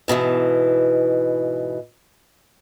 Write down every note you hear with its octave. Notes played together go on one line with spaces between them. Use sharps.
G#2 B2 D#3 E3